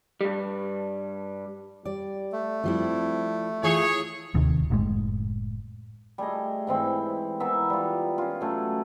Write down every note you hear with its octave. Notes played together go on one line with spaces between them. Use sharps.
G2 G3
G3 D5
A3
F3 G3 C4 E4
E3 F4 G#4 C#5
D1 D#2 C3 D#3
F#1 A2 G#3
G3 A3 G#4 D#5
G#2 E3 C4 G5
E3 B3 A#4 E5
G3 F4
C#4 F4
F#3 A3 C#4